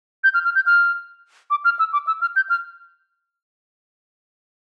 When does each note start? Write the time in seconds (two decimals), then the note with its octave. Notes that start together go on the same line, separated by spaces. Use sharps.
0.24 G6
0.34 F6
0.45 F6
0.55 G6
0.66 F6
1.50 D6
1.65 F6
1.79 E6
1.93 D6
2.07 E6
2.21 F6
2.36 G6
2.50 F6